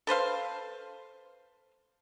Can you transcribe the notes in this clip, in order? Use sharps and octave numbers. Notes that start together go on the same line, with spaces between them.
A4 B4 C5 F5